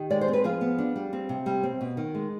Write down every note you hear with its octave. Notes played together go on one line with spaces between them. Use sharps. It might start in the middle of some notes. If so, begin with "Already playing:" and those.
Already playing: D#3 G4
G#3 D5
C5
C4
B4
F3 F4 G#4
B3
D4
G3
C4
C3
G3
C4
B2
D#3
G#3